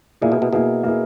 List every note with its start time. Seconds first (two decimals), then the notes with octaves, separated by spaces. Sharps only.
0.21 A#2 A#3 E4 G#4
0.32 B2
0.42 B2
0.53 B2 A#3 E4 G#4
0.83 A#3 E4 G#4